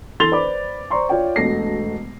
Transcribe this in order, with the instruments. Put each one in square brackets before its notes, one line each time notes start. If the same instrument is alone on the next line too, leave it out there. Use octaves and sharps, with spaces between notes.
[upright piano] E3 A4 C6 A6 F7 G7
B4 C5 D5 B5 D6
C5 D5 A#5 C6 C#6
F4 C#5 D5 G5
E1 B2 A3 A#6 C7